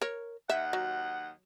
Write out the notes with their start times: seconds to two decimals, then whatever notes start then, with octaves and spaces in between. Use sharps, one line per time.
0.01 A#4 C#5
0.49 D#2 D#5 E5 F#5
0.73 F#3